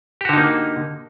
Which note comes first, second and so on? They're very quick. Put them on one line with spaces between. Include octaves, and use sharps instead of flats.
G4 F#4 D3 D#4 A#3